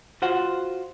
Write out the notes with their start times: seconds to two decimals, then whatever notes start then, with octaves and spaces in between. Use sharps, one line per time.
0.22 F4 F#4 C5 F#5